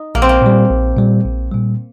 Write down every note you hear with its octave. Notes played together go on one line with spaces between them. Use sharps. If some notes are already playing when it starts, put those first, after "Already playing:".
Already playing: D#4
A#1 A#3
C4
A#3
A#2 G3
A#1
A#2 G3
A#1
A#2 G3